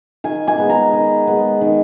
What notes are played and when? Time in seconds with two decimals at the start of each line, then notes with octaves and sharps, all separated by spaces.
0.24 D#3 G#5
0.48 G#5
0.58 G#3 B3
0.70 A#5
0.93 D#3
1.27 G#3 B3
1.61 D#3